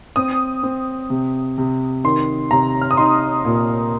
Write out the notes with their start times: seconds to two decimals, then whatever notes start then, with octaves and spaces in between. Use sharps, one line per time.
0.16 C4 D#6
0.63 C4
1.10 C3
1.58 C3
2.04 D#3 C6
2.51 C3 A#5
2.81 F6
2.91 D#6
2.97 D#4 C6
3.45 A#2